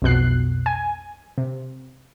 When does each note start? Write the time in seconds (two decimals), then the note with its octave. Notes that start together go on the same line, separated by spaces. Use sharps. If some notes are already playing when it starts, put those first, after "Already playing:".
0.02 B1 F2 B2 F#6 C7
0.66 G#5
1.38 C3